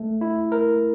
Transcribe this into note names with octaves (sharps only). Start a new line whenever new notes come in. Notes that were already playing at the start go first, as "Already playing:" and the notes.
Already playing: A3
E4
A#4